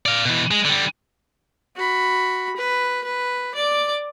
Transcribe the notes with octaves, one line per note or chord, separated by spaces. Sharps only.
D5 F5
B2 E3
G#3
D3 G3
F#4 B5
B4
B4
D5 D6